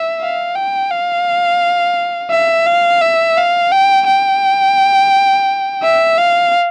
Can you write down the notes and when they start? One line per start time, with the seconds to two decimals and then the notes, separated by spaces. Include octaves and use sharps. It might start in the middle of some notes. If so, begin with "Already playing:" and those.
Already playing: E5
0.21 F5
0.55 G5
0.91 F5
2.31 E5
2.67 F5
3.02 E5
3.37 F5
3.72 G5
4.07 G5
5.83 E5
6.18 F5